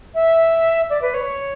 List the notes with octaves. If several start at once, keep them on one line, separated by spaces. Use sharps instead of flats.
E5
D5
B4
C#5